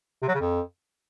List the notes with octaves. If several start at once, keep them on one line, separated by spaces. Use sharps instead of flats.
C3
F#3
C#3
F2